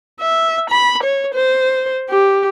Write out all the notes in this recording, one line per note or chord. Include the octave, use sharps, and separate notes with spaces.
E5
B5
C#5
C5
G4